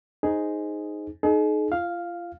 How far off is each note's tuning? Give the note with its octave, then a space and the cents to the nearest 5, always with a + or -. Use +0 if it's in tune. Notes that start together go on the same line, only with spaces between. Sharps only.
D#4 +0 G#4 +0 C5 +0
D#4 -15 G#4 +40
F4 -30 F5 +0